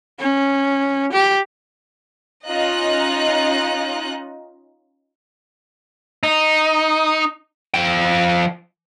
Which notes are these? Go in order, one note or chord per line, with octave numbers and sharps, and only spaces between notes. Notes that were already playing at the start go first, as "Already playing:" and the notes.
C#4
G4
C#4 D#4 F4 D#5 F#6
D#4
F3 G5